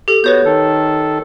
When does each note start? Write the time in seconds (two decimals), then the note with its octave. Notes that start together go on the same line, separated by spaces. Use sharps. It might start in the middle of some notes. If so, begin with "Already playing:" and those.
0.08 G4 A4
0.24 B3 F#4 B4 C#5 G6
0.45 D#3 A4